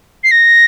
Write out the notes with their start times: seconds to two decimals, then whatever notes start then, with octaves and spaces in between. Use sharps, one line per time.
0.24 C7
0.31 A#6